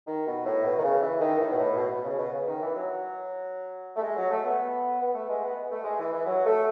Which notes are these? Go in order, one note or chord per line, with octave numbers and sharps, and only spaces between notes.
D#3
B2
A2
B2
D#3
C#3
E3
D#3
A2
B2
A2
B2
B2
C#3
B2
C#3
D#3
E3
F#3
A3
G#3
F#3
A3
B3
B3
A3
G#3
B3
A3
G#3
E3
E3
F#3
A3